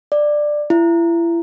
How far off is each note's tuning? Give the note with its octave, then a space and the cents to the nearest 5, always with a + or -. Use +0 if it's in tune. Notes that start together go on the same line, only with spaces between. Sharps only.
D5 +10
E4 +35